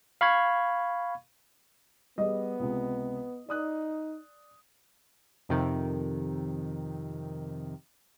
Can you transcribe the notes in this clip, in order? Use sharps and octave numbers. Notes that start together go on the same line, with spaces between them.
F5 B5 C#6 G#6
G3 B3 G#4 D#5
C#2 C3
D#4 D5 D#6 F#6
F2 C3 D#3